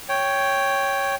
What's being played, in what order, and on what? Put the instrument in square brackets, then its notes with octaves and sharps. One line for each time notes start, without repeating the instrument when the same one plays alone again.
[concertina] C#5 G5